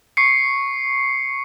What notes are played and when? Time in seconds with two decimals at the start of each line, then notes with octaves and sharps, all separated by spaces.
0.17 C#6 C7 C#7